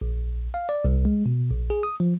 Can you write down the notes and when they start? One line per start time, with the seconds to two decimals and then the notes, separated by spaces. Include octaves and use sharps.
0.01 A#1
0.54 F5
0.69 D5
0.85 C2
1.05 G#3
1.26 B2
1.50 A#1
1.70 G#4
1.83 D#6
2.00 F3